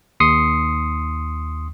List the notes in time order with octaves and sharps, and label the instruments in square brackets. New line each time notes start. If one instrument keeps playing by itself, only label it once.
[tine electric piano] D#2 C6 D#6 C7 C#7